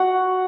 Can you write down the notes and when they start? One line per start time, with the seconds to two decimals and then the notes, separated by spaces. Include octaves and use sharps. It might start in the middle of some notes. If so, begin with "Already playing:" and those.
Already playing: F#4 F#5